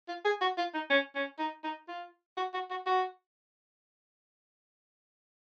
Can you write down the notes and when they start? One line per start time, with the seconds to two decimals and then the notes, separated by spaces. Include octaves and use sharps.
0.08 F4
0.25 G#4
0.41 F#4
0.58 F4
0.74 D#4
0.90 C#4
1.15 C#4
1.39 D#4
1.64 D#4
1.88 F4
2.37 F#4
2.54 F#4
2.70 F#4
2.86 F#4